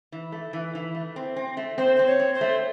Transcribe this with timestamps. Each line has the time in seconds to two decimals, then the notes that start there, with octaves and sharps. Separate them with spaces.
0.12 E3
0.32 A3
0.53 E3
0.75 E3
0.95 A3
1.16 C4
1.36 C4
1.57 A3
1.78 C4 C5
1.97 C4 C5
2.07 C#5
2.20 C4
2.34 C5
2.41 A3